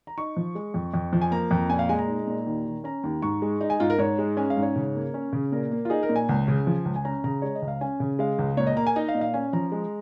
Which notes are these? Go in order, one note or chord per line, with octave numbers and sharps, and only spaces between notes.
A#5
D#4 C#6
F3
G#3
F2
F2
F3
G#5
A#3 A#5
F2
A#2 G#5
F5
G#3 G#5
A#5
D#4
A#2
D#2
D#3
C#4 A#5
D#2
G#2 C#6
G#3
D#4
G#5
G#2 F4
A#4
G#2 C#5
G#3
C#4 G#5
F5
G#2
C#5
C#3
A#3
C#4
C#3
A#2 A#4
A#3
F4
D#4 G#4
A#4
A#2
G#5
C#2
C#3
F3
C#2
G#5
C#4 A#5
C#3 A#5
G#3 C#5
D#5
C#2
F5
C#4 G#5
C#3
G#3 F5
C#2
A#2 C#5
D#5
A#3 A#5
G#5
D#4 D#5
F5
A#2
F5
C#4 G#5
F3 A#5
G#3